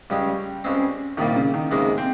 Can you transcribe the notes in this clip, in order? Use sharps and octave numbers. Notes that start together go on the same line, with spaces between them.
C#2 C#3 G3 G#3
C#2 C#3 G#3 C4
C2 A#2 D#3 G3 A#3
C#3
D#3
C#2 C3 D#3 G#3 A#3 D#4
C4